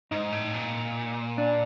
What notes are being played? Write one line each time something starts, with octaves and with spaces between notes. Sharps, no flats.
G#2 D#4
A2
A#2
D4